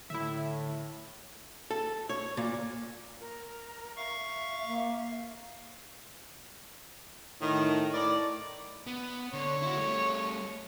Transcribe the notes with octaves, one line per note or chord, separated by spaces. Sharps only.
A2 D3 E4 E5
A4
C#5
A#2
A#4
E5 F5 C#6
A#3
A2 D#3
A2 A#4 D5
B3
D3 C#5
E4 F#4
G3 A3